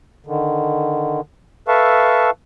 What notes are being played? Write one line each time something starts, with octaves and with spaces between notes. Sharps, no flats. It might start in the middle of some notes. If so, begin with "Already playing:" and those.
D3 D#3
A4 B4 E5 F5 A5 C#6